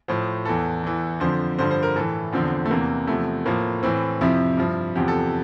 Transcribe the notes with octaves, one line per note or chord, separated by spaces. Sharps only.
A2 F3 C5
E2 E3 A4
E2 E3
F2 D3 F3 C5
G2 D3 F3 C5
C5
A#4
A2 E3 A4
E2 D3 F3 C4
A3
E2 C3 E3 A#3
E2 C3 F3 A3
A2 F3 A#3
A2 E3 C4
F2 C3 F3 E4
G2 F3
E2 C3 F3 G4
A4